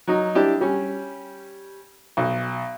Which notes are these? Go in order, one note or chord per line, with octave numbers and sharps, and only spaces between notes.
F#3 D#4
D4 E4 G4
G3 C#4
B1